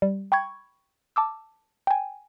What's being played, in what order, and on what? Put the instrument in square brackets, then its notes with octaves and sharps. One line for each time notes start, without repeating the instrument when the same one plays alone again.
[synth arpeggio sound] G3
G5 B5 C#6 G#6
A5 D6 E6
G5 G#5